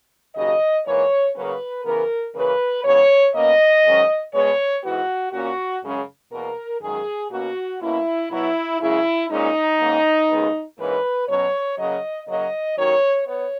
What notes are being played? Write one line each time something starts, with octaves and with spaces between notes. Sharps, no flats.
D#2 C#3 F#3 D#5
G#2 E3 A#3 C#5
C#3 F#3 A#3 C#4 B4
C#3 E3 B3 A#4
C#3 E3 A#3 C#4 B4
E2 C#3 G#3 C#5
B2 A#3 C#4 D#5
G#2 D#3 F#3 C#4
B2 G#3 B3 C#5
G#2 E3 B3 F#4
A#2 A#3 C#4 F#4
F#2 C#3 G#3 C#4
E2 B2 A#3 A#4
F#2 D#3 G#3 G#4
B2 A#3 C#4 F#4
B2 A#3 C#4 E4
B2 F#3 B3 E4
F#2 C#3 G#3 E4
A#2 G#3 C#4 D#4
G#2 D#3 A#3 C#4
D#2 C#3 G#3 B3
G#2 E3 A#3 C#4 B4
B2 F#3 C#4 C#5
C#3 F#3 A#3 C#4 D#5
C#3 F#3 A#3 C#4 D#5
D#2 D#3 F#3 C#4 C#5
B3 C#5